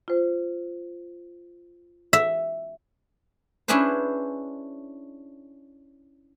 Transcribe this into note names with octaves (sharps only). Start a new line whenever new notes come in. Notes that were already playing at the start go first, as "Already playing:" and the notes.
F4 C5
E5
C#4 D4 E4 G#4 B4 C5